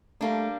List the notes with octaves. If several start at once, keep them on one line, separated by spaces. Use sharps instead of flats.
G3 A3 A#3 D4